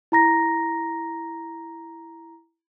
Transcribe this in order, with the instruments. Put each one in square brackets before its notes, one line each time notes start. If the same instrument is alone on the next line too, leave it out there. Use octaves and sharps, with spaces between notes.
[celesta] E4 A#5 A#6